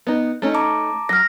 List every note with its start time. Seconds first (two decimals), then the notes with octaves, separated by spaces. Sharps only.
0.07 B3 D#4
0.42 A3 C#4 D#4
0.54 A5 A#5 D6
1.09 F#3 F6 A#6